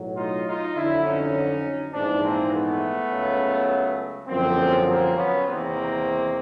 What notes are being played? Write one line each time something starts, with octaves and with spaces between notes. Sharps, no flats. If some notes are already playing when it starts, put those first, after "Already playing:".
Already playing: B1 A2 F#3
D#4 F4
D#4 F4
F2 D3 F#3 D4 E4
C#4 D#4
A#1 G#2 E3 C4 D4
A#3 C4
A3 B3
C#2 C#3 F#3
G1 F#2 D3 F3 A#3 C4
A#3 C4
B3 C#4
E2 C3 D#3 A#3 C4